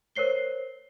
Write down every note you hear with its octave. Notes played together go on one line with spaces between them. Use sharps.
A#4 C5 C#5 C7 G7